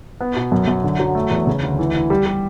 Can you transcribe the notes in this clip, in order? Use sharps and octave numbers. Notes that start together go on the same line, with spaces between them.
B3
B2
F#2
F#2
D3
F#3
A3
E2
C#3
D2
E3
E4
G3
G3